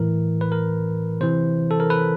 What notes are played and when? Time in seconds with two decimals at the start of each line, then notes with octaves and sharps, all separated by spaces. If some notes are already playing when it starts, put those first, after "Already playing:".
Already playing: A2 E3 A#4
0.41 B4
0.52 A#4
1.21 C3 E3 C5
1.71 A4
1.80 A#4
1.90 B4